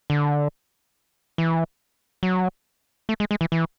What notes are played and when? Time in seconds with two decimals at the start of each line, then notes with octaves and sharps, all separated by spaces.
0.10 D3
1.38 E3
2.23 F#3
3.09 A3
3.20 G#3
3.31 G#3
3.41 E3
3.52 E3